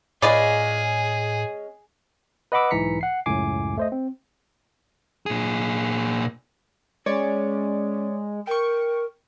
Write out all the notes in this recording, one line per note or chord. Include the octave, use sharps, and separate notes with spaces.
A2 G#3 C#4 F4 G#4 B4 D5
B4 D#5 F#5 B5 D6 E6
B1 G#2 E3 A#5 B6 C#7
F#5 C7
C#2 F#2 A2 G#5 D6 C7
A3 C5 D#5
C4
A#2 G#4
G#3 C#4 C#5 D5
A#4 G5 C#6